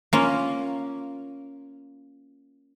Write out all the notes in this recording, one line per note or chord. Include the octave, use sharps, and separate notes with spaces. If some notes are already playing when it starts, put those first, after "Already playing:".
A#3 C#4 F4